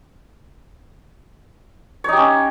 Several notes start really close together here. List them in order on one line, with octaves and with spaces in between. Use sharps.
C#5 D#4 G4 C#4